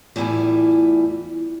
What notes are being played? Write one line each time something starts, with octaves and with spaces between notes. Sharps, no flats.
E2 A2 G3 E4 F4 G#5